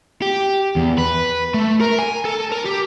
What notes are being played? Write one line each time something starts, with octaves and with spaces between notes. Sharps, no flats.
G4
E2
B4
A3
A#4
G#5
A4
A#4
G4